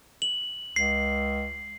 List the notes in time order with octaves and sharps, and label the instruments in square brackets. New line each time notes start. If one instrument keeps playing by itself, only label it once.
[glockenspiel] F#7
[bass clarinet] C#2 [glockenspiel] C7